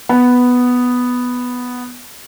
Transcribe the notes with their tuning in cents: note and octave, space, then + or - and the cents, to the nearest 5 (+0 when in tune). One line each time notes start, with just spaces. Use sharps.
B3 +0